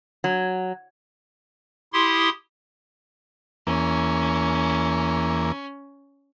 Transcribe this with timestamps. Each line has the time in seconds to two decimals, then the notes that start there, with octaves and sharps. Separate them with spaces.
0.24 F#3
1.93 E4 G4 C6 D#6
3.67 E2 A#3 C#4